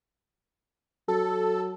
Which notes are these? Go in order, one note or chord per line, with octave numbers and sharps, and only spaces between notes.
F#3 A4